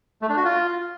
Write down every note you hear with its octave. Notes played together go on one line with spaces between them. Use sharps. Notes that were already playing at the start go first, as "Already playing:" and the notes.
A3
D4
F#4
F4